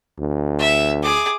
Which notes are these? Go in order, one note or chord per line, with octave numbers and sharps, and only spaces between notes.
D2
E5
G#4 D6